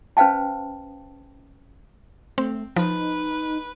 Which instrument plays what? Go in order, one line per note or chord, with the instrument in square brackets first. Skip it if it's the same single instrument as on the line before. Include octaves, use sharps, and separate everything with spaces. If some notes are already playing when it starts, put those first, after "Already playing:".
[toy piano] C#4 B4 C5 F5 G5 A5
[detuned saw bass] A3 [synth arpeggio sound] C4
[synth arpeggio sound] F3 [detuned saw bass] D#4 [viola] B4